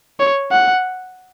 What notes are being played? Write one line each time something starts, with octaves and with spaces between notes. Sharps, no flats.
C#5
F#5